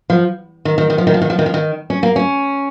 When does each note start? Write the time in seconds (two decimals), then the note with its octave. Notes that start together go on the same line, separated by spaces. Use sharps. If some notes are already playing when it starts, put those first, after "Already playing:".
0.10 F3
0.65 D#3
0.78 D#3
0.90 D#3
0.98 F3
1.07 D#3
1.14 F3
1.22 D#3
1.30 F3
1.39 D#3
1.46 F3
1.54 D#3
1.90 C#4
2.03 A#3
2.16 C#4